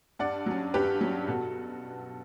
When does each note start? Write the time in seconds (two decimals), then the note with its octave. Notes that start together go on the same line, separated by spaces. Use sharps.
0.19 G2 D5 F#5
0.46 F#3 C#4
0.74 G2 G4 B4
1.01 F#3 C#4
1.27 B2 F#4 A4